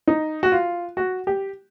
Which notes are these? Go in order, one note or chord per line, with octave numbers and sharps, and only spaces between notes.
D#4
F#4
F4
F#4
G4